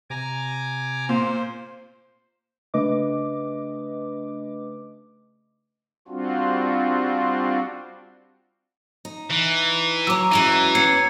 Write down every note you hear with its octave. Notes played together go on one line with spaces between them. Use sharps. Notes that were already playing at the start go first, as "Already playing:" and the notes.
C3 G#5 A#5 D6
A#2 C5
C#3 A3 D4 B4 D#5 D6
G3 C4 D4 F4 F#4
D#4
E3
F#3 C#5 A#5 D6 E6
F#2 E3 F#3 G#3 D#7
B3 C#4 G#6 C7 C#7